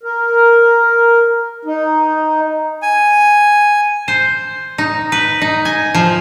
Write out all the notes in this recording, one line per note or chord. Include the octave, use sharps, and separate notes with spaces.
A#4
D#4
G#5
C5
D#4
B4
D#4
G#5
F3